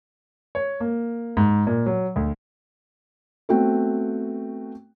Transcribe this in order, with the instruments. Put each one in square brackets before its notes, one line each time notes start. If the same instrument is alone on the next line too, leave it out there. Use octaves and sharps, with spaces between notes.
[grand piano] C#5
A#3
G#2
A#2
F#3
D2
[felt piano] A3 B3 C4 F#4 G5